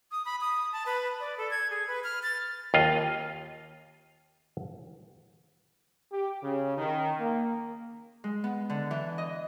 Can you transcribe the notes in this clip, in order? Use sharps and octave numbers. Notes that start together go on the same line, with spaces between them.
D#6
B5
D#6
A5
B4
D5
A4
G#6
G#4
B4
F6
A6
D#2 F4 D#5
G4
C#3
D#3
A#3
G#3
B3
D3
E3
D#5